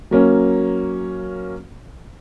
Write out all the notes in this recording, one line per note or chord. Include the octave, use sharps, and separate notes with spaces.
F#3 A#3 C#4